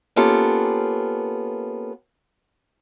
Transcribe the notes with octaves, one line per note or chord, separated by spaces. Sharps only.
A#3 B3 C#4 F4 G4 A4